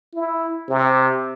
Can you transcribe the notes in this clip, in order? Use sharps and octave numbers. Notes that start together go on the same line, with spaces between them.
E4
C3